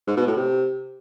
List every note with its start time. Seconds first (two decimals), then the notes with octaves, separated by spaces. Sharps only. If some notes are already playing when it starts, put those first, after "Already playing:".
0.07 G#2
0.17 B2
0.27 A2
0.37 C3